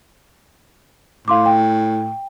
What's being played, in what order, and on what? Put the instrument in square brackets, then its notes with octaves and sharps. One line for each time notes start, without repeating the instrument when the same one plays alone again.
[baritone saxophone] A2 [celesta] F5 C6 D6
[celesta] G5